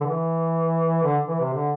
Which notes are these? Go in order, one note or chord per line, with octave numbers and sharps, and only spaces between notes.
D3
E3
D3
E3
C3
D3